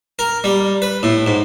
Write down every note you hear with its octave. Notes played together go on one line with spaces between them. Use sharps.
A#4
G3
B4
A2
G#2